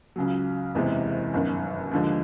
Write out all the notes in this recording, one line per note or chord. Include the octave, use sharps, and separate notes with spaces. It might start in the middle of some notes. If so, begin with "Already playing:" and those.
C#2 C#3 F#3
F#1 E2 C3 E3 G#3
G1 F#2 D#3
D#2 D3 F3 G#3